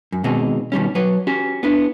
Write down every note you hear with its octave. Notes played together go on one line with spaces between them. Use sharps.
F#2
B2 D#3 G#3 C4 D#4
B2 D#3 G3 C#4
F#3 B4 C#5
C#4 F#4 G4
B3 D4 E4